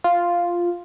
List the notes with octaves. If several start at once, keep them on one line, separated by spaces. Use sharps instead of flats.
F4